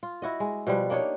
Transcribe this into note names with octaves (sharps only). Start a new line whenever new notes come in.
F4
E4 F#4 D#5
G#3
B2 F3 G3 B4
A#3 D4 D#4 C#5